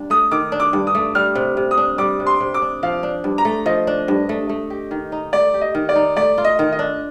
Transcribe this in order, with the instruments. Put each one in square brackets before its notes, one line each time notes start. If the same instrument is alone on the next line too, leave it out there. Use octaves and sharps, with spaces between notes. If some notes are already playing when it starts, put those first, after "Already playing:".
Already playing: [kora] G2 D4
[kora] A3 [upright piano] D#6
[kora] D#3 [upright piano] D6
[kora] D4
[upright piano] D6
[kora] G2
[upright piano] D#6
[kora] A3
[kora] G3 [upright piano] F6
[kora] C3
C3
[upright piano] D#6
[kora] D4
[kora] G3 [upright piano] D6
[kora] C3
[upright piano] C6
[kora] C3
[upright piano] D6
[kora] D4
[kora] F3 [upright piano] F5
[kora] D4
G2
[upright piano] A#5
[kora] A3
[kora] F3 [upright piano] D#5
[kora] D4
G2
A3
A3
G4
D#3
D#4
[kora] A3 [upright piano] D5
[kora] G4
[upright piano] D#5
[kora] D#3
[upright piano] D5
[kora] D#4
[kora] A3 [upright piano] D5
[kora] F4
[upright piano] D#5
[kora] D#3
[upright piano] D#5
[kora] D4